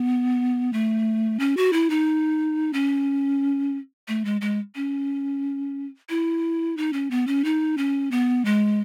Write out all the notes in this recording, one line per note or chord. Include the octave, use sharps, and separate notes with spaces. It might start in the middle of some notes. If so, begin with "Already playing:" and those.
Already playing: B3
A3
C#4
F#4
E4
D#4
C#4
A3
G#3
G#3
C#4
E4
D#4
C#4
B3
C#4
D#4
C#4
B3
G#3